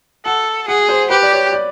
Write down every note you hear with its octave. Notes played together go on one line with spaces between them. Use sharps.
A4 F#5
G#4 F#5
C5
G4 B4
D5
C#5
D5